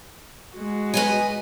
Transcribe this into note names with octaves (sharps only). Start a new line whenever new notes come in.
G#3 F#4
B4 D#5 G#5